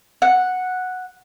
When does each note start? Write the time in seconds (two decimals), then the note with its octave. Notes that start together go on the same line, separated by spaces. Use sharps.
0.22 F#5